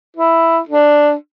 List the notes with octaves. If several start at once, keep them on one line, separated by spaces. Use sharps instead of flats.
E4
D4